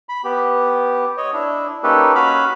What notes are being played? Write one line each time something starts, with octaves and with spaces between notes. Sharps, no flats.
B5
B3 G4
C#5 D#5
D4 E4
A#3 C#4 D#4 G4 A4 B4
C#4 F#4 F5 B5